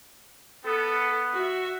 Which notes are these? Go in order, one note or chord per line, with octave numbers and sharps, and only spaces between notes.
B3 A4
F#4 E5